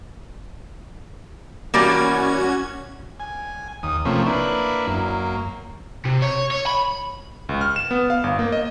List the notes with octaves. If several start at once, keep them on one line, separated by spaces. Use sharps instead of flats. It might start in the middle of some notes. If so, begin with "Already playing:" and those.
E3 G3 A#3 C#4 F#4 G#6
G#5
D#2 D#6
C3 F3 A3 A#3 C#4
A#3 D4 E4 B4
F#2 A#3
C3
C#5
C#5
B5
C#2
F6
E7
B3
F5
G1
A#3
D#5